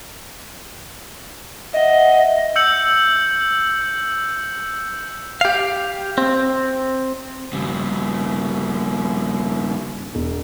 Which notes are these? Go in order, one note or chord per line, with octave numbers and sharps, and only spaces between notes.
D#5 E5 F#5
E6 G6 C#7 F#7
G4 F5
C4
G2 C#3
E1